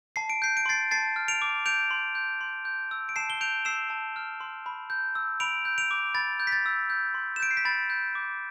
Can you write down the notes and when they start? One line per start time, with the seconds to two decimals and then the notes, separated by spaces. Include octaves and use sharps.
0.16 A5 C7
0.30 D7
0.42 G6 C7
0.57 D7
0.66 C6 A6 C7
0.91 A5 A6 C7
1.16 F6
1.28 D7 F7
1.42 D6
1.66 G6 D7 F7
1.91 C6
2.15 G6
2.41 C6
2.65 G6
2.91 E6
3.09 D7
3.16 A5 C7 E7
3.30 G7
3.41 G6 D7 F7
3.65 E6 C7 E7
3.90 A5
4.16 F6
4.40 C6
4.66 B5
4.90 G6
5.15 E6
5.40 B5 D7 F7
5.65 G6
5.78 D7 F7
5.91 D6
6.15 B5 A6
6.40 G6
6.47 B6
6.52 A6
6.66 E6
6.90 G6
7.14 C6
7.36 E7
7.40 G6 D7
7.51 C7
7.57 B6
7.65 B5 A6
7.90 G6
8.15 D6